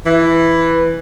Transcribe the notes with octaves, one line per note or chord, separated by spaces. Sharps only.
E3